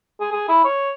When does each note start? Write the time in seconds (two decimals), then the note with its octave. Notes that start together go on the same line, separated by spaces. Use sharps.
0.20 G#4
0.32 G#4
0.49 E4
0.65 C#5